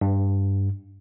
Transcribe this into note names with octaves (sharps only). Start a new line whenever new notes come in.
G2